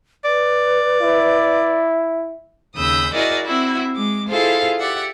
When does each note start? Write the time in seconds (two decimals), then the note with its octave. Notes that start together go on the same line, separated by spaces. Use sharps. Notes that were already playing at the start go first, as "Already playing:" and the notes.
0.25 B4 D5
1.02 E4
2.74 D#2 C#3 B5 D#6 E6 G6
3.14 E4 F#4 G#4 A#4 D5 D#5
3.46 C4 E4 F#4 E5
3.94 G#3 D6
4.28 E4 F4 G#4 A4 C5 F5
4.80 G4 D5 E5 F#5